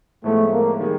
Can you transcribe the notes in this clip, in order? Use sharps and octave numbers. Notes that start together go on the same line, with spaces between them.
A2 F3 G#3 A3 B3
A#3
D#3 G3 B3 D#4 G#4